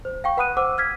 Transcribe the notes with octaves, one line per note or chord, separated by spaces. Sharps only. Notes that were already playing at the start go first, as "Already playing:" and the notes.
C5
F5 G5 C#6
B4 F#5 B5 D#6 F#6 D#7
C5 F#5 D6 E6
F6 G#6 B6